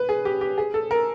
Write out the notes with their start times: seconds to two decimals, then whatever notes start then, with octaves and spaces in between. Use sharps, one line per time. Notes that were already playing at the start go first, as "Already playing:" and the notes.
Already playing: B4
0.09 G#4
0.25 G4
0.41 G4
0.58 G#4
0.74 A4
0.91 A#4